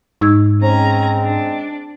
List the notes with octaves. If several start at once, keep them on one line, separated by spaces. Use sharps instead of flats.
G#2 D#4 E6 G#6
G#3 C4 C#4 A#5
D4